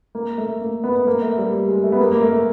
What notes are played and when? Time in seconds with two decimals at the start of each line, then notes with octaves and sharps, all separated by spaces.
0.15 A#3
0.38 A3
0.61 A#3
0.84 B3
0.96 B3
1.07 A#3
1.22 A3
1.38 G3
1.53 G3
1.68 G#3
1.84 A3
1.92 B3
2.00 A#3
2.11 A#3
2.22 A3
2.34 G#3